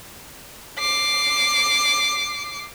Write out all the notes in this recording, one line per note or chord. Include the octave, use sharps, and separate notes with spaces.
D6 C7